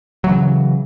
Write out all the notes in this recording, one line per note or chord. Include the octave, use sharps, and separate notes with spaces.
C#3 E3 F#3